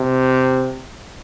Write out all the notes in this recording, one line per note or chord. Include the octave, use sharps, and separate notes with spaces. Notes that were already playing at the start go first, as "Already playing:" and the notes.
Already playing: C3